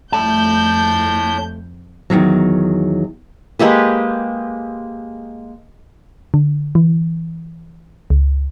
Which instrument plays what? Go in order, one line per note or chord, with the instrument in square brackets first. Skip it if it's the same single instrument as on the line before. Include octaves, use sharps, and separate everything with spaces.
[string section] F2 G6 [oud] G3 A3 E4 [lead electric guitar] C#5 A5
[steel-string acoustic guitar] E2 G#2 D#3 F#3
[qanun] G#3 A#3 G4 B4
[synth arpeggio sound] D3
E3
C#2